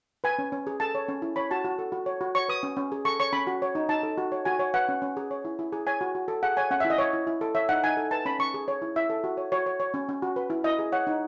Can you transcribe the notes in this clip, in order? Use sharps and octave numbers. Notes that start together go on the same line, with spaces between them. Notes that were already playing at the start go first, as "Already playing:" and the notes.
B4 G#5
C#4
C#4
G#4
A4 A5
C#5
C#4
E4
C#5 B5
F#4 A5
F#4
A4
F#4
C#5
F#4
C#5 C#6
B4 D#6
C#4
C#4
G#4
A4 C#6
C#5 C#6
C#4 B5
F#4
C#5
D#4
D#4 A5
A4
F#4
C#5
F#4 G#5
C#5
B4 F#5
C#4
C#4
G#4
C#5
E4
E4
G#4
C#5 G#5
F#4
F#4
A4
G#4 F#5
C#5 G#5
C#4 F#5
E5
E4
D#5
C#5
E4
E4
A4
C#5 E5
D#4 F#5
D#4 G#5
A4
B4 A5
C#4 B5
C#4 C#6
G#4
C#5
E4
E4 E5
A4
F#4
C#5
F#4 C#5
C#5
C#5
C#4
C#4
F#4
B4
E4
E4 D#5
G#4
C#5 F#5
D#4